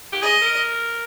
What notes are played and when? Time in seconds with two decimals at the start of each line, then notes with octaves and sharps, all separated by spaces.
0.13 G4
0.22 G#4 D#5
0.42 A#4